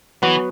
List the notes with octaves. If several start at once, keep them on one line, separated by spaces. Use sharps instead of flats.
E3 F#3 B3 F#4 B4